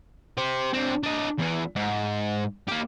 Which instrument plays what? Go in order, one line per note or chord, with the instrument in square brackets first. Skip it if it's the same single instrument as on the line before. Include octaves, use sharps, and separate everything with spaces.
[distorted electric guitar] G4 C5
D3 C4
D4 D#5
E2 E3
G#2
A#3 G4